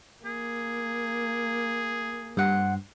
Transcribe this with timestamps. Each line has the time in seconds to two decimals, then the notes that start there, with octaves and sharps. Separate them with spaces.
0.25 A#3 G#4
2.37 G2 C5 F#5